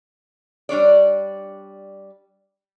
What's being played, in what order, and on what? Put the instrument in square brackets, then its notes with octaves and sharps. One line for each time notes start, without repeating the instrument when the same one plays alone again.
[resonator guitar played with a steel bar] G3 D4 C#5 D5